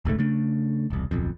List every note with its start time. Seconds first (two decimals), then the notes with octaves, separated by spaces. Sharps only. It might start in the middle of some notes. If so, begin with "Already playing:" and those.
0.05 E1 C#2 G#2 A3
0.19 C#3 A3 D4
0.90 E1 C2
1.11 D1 B1 F2